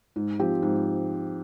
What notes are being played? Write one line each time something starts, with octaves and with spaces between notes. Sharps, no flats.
G#2
F3 C4 G4
G#2